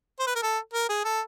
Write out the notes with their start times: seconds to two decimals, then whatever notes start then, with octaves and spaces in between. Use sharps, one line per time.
0.20 C5
0.27 B4
0.35 A#4
0.43 A4
0.73 A#4
0.89 G#4
1.05 A4